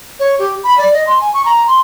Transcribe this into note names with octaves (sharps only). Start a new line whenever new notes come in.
C#5
G4
B5
D5
D#5
C6
G#5
C#6
A#5
C6